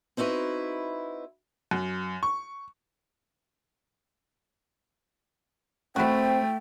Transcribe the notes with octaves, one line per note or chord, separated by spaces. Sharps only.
C4 D#4 E4 F#4 B4
F#2
C#6
A3 C4 E4 F#4 G5